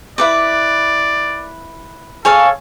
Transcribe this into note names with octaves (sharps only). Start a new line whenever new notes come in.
E4 B4 D5 D6
G#4 A4 C#5 F5